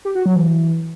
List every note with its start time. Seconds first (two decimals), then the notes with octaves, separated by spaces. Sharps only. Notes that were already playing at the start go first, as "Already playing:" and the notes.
0.05 G4
0.15 F#4
0.26 F#3
0.36 E3